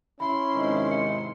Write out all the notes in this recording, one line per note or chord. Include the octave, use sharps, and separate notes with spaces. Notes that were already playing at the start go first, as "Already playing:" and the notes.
C#4 E4 B5 C6
G#2 C3 D#3
C#7